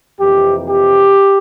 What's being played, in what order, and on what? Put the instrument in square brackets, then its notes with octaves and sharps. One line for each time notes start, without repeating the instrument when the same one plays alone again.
[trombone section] F2 C3 E3 A#3 G4
G4